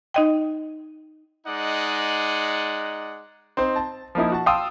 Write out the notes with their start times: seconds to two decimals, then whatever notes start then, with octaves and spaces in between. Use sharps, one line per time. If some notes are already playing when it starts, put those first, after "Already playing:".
0.14 D#4 D#5 G5
1.47 G#3 D#4 D5 F#5
3.57 C4 D#4 C5
3.76 A5
4.15 F3 A#3 D#4 E4
4.32 F#4 A5
4.46 F5 G5 A5 C6 D#6 E6